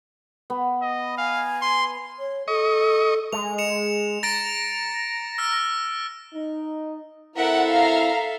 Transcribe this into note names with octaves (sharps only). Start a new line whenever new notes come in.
B3
D#5
F5 G#5
C6
C#5
A4 D#5 C#6
G#3 F7
C#7 E7 F7
A#5 A6 A#6 D7
E6 F6 A#6
D#4
C4 E4 A4 A#4 E5 F#5
F5 A#5